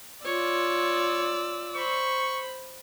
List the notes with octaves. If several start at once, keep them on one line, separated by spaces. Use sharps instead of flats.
F4 C#5 D5 E6
C5 B5 C#6